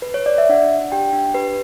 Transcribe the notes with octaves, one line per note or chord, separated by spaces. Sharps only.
B4
C#5
D5
E5
D4 F#5
D4
G4 G5
D4
G4 B4